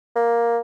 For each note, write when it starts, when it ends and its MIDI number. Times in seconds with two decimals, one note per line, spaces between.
0.16 0.59 58